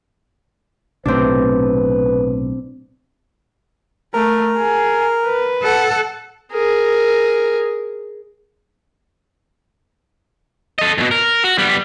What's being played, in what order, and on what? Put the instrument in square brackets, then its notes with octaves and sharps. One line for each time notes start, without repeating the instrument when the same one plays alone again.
[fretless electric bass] B1 A2 C3 [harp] C4 D4 [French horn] B4
[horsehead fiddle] A3 [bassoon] A#4
[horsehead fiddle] G#4
B4
[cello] A4 F#5
[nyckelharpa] G#4 A#4
[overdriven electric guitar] A4 D#5
E2 B2
A#4
F#4
G3 B3